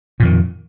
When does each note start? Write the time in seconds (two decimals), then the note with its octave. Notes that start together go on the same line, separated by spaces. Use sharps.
0.20 A#2
0.22 F2
0.25 D#3